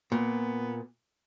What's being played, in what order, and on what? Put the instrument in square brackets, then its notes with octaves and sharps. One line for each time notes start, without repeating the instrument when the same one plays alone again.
[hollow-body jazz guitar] A#2 [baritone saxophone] B3